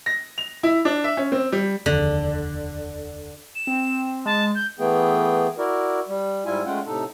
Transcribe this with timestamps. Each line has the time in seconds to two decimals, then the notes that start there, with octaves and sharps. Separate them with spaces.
0.06 A#6
0.38 F7
0.63 E4
0.85 D4
1.04 E5
1.17 C#4
1.32 C4
1.52 G3
1.86 F1 D#2 D3
3.55 E7
3.67 C4
4.26 G#3 A5
4.55 G6
4.79 E3 A3 B3 G#4 G5
5.58 E4 F#4 A#4 D5
6.08 G3
6.45 G#2 G3 E4 F4 G#5
6.65 G#3 A3 C#4 F4 F#5 G5
6.86 A2 C3 D#4 A4